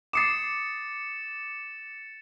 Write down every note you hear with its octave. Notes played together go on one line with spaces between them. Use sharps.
D6 D#6 A6 C7 C#7 E7